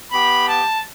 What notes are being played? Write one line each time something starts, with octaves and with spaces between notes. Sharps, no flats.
B3 G4 B5
A5